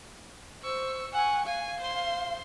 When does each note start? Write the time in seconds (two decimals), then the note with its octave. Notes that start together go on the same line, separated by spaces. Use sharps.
0.63 C5 C#6 E6
1.13 F#5 G#5 C#6
1.46 F5 G#5
1.81 C5 C6